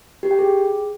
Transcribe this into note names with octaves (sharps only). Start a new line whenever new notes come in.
G4
G5
G#4